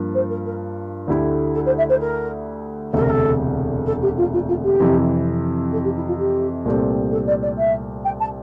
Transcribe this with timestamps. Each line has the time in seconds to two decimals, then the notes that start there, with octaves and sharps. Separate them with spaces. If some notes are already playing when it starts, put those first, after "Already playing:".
Already playing: G2 F3 A#3 F4
0.15 C5
0.30 A#4
0.46 A#4
1.08 D2 D3 A3 E4 G4
1.54 A4
1.66 C5
1.78 E5
1.89 C5
2.01 A#4
2.93 E1 D2 C3 A4
3.02 A#4
3.10 A4
3.86 A4
4.02 G4
4.18 F4
4.33 F4
4.48 F4
4.64 G4
4.79 F2 C3 E3
5.73 A4
5.84 G4
5.96 E4
6.07 F4
6.19 G4
6.65 C2 A#2 A3 C4 G4
7.12 A4
7.27 D5
7.42 D5
7.58 E5
8.05 G5
8.20 A5